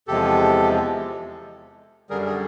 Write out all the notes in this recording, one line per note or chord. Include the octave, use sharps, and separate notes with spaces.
E2 C3 F3 G#3 G4 A4
F#2 D3 G3 G#4 A#4
G#4